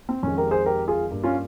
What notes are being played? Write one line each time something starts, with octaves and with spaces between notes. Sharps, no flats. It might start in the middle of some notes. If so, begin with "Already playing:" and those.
C4
F2 D#3 G#3 C#4
G4 A#4
G#4 C5
G4 A#4
F4 G#4
G2 G3 A#3
C#4 F4